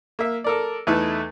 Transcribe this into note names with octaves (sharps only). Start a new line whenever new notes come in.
A#3 E5
A4 A#4 D5
E2 A3 D#4 E4 A4 B4